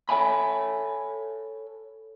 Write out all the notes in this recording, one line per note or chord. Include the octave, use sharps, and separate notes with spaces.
A4 C#5 E5 G#5 B5